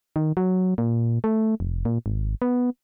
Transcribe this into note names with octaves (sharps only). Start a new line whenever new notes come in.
D#3
F#3
A#2
A3
F1
A#2
G#1
B3